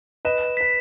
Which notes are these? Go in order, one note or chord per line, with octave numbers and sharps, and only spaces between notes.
B4 D#5 E7
B4 B6